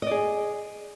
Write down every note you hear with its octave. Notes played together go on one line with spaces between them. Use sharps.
G#4 D5 D#5